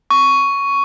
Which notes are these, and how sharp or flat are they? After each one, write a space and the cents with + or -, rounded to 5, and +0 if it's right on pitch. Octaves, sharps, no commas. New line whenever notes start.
C#6 +10